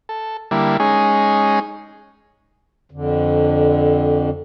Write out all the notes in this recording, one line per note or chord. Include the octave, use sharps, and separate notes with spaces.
A4
D3 G3 A#3 E4
G#3 C#4 D#4 G#4
F2 D3